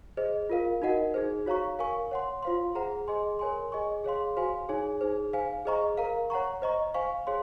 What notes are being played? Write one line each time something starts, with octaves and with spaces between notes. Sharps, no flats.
G#4 C5 D#5
F4 A#4 F5
D#4 F#4 A#4 D#5 F#5
D#4 G#4 C5
F#4 C#5 F5 A#5 C#6
A#4 F5 G#5 C#6
C#5 F#5 C6
F4 C5 F5 C6
G#4 C5 F#5 A#5
G#4 D#5 G#5 C6
A#4 C#5 G#5 C6
G#4 D#5 G#5 C#6
G#4 C#5 F5 C6
F#4 C5 F5 G#5 C6
D#4 G#4 C#5 G#5
D#4 G#4 C5
C5 F5 G#5
G#4 C5 D#5 A#5 C#6
A#4 F5 A#5
C#5 F#5 A#5 C#6
C5 D#5 A#5 C#6
C5 F5 G#5 C#6
G#4 C#5 F5 C6